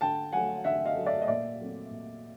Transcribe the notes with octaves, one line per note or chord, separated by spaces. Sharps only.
D3 G5 A5
F#3 A3 F#5 G#5
D3 E5 F#5
D#5 F5
F#3 A3
D5 E5
D#5
A#2 D5 E5
F#3 A3 C4
A#2